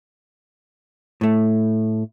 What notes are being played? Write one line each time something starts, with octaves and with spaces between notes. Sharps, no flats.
A2 A3